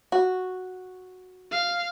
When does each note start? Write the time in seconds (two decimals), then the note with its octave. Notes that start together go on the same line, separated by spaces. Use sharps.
0.12 F#4
1.51 F5